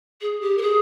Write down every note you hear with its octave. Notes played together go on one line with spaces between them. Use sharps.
G#4
G4
A#4
G#4